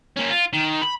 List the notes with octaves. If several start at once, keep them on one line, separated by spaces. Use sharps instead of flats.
A#3 C#4
F4
D#3
B5